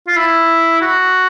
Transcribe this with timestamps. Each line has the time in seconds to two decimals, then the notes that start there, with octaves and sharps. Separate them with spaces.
0.08 F4
0.17 E4
0.81 F#4